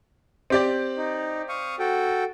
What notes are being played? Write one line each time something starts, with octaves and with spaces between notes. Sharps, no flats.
C4 G4 D5
D#4
F5 C#6 D#6
F#4 A4 G5